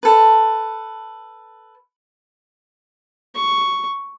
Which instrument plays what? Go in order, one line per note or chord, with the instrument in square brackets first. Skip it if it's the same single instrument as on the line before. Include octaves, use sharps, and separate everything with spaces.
[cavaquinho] A4 B4
[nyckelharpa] C#6